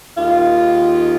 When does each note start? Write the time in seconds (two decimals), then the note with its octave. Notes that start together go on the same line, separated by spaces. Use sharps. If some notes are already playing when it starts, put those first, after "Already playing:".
0.17 D#2 D#3 G#3 F4